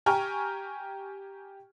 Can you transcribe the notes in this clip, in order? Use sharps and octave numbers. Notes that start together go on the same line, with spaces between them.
G4 G5 G#5 A#5 C#6 F6